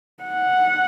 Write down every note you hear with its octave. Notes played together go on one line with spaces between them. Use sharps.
F#5